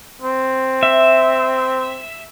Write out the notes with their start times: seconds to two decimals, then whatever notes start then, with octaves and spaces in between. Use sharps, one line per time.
0.22 C4
0.83 E5